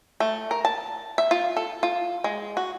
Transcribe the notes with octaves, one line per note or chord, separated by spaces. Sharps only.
A3
A#4
A5
E5
F4
A4
F4
G#3
F#4